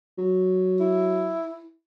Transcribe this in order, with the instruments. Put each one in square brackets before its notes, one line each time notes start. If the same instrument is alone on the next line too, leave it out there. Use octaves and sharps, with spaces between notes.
[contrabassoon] F#3
[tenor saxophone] E4